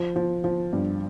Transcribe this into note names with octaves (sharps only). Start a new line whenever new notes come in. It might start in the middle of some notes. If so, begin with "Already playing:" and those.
Already playing: F3
F3
F3
G2